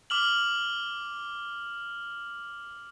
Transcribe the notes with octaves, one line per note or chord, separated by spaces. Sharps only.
D6 F6 F#7